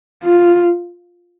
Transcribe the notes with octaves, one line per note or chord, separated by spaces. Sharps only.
F4